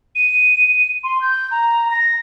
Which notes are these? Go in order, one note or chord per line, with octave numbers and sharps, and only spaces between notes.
D#7
C6
G6
A#5
A#6